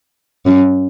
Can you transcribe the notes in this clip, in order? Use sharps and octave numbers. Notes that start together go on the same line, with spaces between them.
F#2